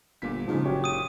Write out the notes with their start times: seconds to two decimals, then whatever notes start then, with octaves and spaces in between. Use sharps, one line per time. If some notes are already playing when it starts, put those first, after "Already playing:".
0.22 G1 A#2 B6
0.48 G#2 C#3 F3
0.65 F#1 F#4 G4 C#5
0.84 D#6 D#7